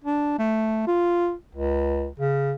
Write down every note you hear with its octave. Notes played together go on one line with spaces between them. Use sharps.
D4
A3
F4
C#2
C#3